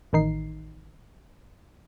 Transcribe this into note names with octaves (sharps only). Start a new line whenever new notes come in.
A1 D#3 D#4 C7